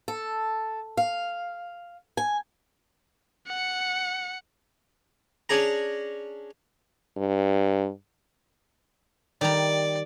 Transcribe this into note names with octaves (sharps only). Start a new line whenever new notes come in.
A4
F5
G#5
F#5 C#7
C#4 D4 G#4 A#5
G2
D#3 G3 D5 A#5